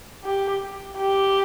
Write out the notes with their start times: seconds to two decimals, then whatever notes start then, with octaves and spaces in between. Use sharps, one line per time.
0.24 G4
0.99 G4